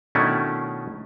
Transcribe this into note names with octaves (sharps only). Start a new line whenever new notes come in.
B2 D#3 A3 C#4 D4 E4